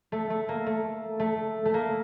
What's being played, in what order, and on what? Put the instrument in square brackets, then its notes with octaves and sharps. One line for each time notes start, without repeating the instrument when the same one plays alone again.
[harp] A3
A3
A#3
A3
A3
A3
A#3